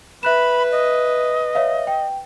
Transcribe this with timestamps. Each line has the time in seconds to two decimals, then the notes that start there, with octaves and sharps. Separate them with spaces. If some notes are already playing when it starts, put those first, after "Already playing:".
0.23 B4 E5 B5 F#6 E7
0.72 D#5
1.55 C#5 E5 F5
1.87 G5